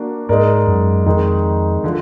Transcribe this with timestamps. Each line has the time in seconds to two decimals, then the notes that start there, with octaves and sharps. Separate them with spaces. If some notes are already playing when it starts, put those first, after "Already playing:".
Already playing: A#3 D4 F#4
0.29 G#2 G#3 D#4 A#4 D5
0.67 F#2
1.06 F2 D#3 G#3 D#4
1.84 D3 F3